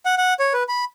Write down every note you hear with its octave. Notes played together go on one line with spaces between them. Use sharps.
F#5
F#5
C#5
B4
B5